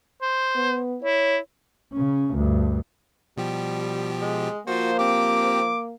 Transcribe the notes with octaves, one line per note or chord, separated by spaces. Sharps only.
C5
B3
E4 C#5
C#3 C#4
D2 G2
B2 F3 G3 G4
G#3
F3 A#3 F4 F#4 C5
C4 G4 D6